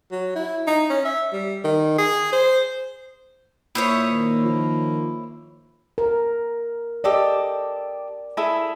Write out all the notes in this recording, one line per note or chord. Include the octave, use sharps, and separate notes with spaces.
F#3
E4
D#4
C#4
E5
G3
D#3
G#4
C5
A#2 E4 C5 C#5 E5 D#6
D#3 A#3
F3
A#4
G4 A4 D5 D#5
E4 G#4 A4